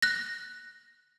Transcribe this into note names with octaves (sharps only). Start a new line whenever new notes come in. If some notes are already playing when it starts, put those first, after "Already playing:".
F#6 A#6